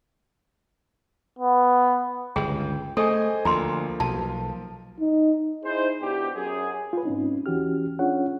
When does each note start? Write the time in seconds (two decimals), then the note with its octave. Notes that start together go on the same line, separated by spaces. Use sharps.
1.39 B3
2.36 G1 C#2 G#4 G5
2.97 A3 G#4 A4 C5 D#5 G#5
3.45 D2 F3 A#3 A#5 C6
4.00 B1 A5
5.00 D#4
5.63 D#4 E4 G#4 C5
6.00 B2 D4 E4 G4
6.35 F#2 G#4
6.93 F4 B4
7.05 G#2 C4 C#4 D#4
7.46 D#2 E3 C#4 F#4 G4 F6
7.99 C#4 D4 F4 G#4 C#5 F#5